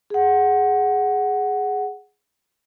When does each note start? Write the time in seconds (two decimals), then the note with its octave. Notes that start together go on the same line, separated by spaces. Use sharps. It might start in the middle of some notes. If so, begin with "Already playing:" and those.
0.10 G#4 F#5